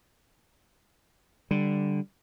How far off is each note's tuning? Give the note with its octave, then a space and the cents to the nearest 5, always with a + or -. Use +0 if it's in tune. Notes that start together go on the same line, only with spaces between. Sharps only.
D3 +0 G3 +0